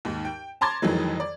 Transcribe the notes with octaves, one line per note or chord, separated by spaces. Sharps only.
D#2 G#2
G5
A5 A#5 C6 D6 G#6 A6
F2 D#3 E3 F#3 G#3
D5